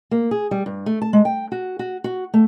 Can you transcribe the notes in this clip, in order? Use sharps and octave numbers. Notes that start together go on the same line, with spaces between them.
A#3
G#4
G3
G2
A3
A5
G#3
G5
F#4
F#4
F#4
A3